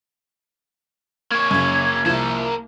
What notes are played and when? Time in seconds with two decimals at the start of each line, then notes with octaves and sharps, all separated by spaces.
1.31 A#3 C#5 G#6
1.51 F#2 C#3
2.06 C2 F3 A#3 A5